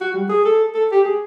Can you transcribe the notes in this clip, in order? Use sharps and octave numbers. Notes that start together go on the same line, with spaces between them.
F#4
G3
G#4
A4
A4
G4
G#4